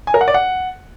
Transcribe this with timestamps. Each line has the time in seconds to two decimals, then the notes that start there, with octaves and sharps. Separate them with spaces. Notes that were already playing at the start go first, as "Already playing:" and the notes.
0.07 G#5
0.14 A#4
0.21 F#5
0.28 D5
0.34 F#5